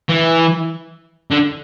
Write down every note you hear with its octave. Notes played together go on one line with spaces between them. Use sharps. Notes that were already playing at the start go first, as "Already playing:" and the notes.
E3
D3